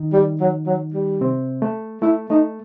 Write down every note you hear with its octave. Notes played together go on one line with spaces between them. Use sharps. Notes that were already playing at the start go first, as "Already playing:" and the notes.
Already playing: D#3 D#4
G3
F#3
F#3
G3
C3 C4
A3
A3 E4
A3 D#4